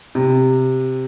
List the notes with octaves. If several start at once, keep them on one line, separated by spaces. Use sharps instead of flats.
C3